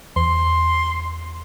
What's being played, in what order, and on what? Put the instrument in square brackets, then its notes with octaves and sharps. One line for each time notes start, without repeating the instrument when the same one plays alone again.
[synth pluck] E2 [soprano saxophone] C6